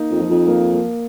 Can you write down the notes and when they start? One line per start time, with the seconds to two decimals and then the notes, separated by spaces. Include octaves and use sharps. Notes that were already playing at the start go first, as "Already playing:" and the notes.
Already playing: A#3 D#4
0.11 F2
0.20 F3
0.29 F2
0.47 A#3
0.73 A#3